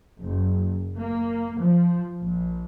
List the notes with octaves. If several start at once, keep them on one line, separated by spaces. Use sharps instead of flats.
F#1
A#3
F3
A#1